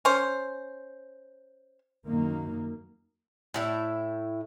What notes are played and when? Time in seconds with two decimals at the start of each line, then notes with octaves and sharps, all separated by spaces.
0.05 C#4 C5
2.07 F#2 D#3 A#3
3.54 A2 E4 E5